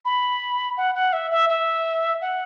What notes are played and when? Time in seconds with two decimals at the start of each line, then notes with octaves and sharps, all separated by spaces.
0.05 B5
0.77 F#5
0.95 F#5
1.13 E5
1.31 E5
1.49 E5
2.21 F#5